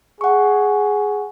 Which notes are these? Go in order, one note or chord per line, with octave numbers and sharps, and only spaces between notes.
G#4 F#5 C#6